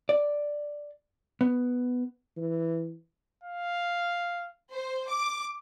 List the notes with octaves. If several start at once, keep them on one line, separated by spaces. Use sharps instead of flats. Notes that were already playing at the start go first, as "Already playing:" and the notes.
D5
B3
E3
F5
C5
D6